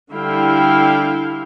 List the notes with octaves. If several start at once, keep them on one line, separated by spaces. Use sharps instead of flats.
D3 G3 E4 F5 G5